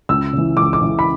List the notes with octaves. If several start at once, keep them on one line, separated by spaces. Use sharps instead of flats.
C#2 E6
C#3 E3
C#2 D6
D6
C#3 E3
B5